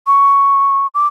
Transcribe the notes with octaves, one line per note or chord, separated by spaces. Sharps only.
C#6
D6